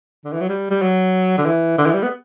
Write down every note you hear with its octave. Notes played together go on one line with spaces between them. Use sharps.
D3
E3
F#3
G3
G3
F#3
D3
E3
D3
E3
G3
B3